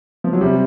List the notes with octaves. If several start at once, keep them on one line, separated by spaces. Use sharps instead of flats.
F3
F#3
C3 G3